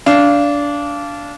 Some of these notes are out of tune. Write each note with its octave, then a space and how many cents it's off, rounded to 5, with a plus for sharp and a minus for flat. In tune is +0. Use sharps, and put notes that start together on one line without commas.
D4 -20 F5 -15